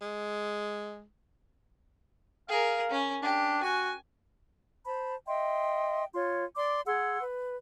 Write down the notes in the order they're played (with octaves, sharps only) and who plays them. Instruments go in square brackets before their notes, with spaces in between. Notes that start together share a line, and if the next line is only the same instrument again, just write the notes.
[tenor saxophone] G#3
[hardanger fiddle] G#4 A#4 [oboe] F5
[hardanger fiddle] C#4
[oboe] D4 [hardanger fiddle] G4
[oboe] F#4 [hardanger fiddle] G#5
[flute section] C5 A5 B5
D#5 E5 G5 C6
F4 C#5 C6
D5 C6 D6
G#4 F#5 C6 E6
B4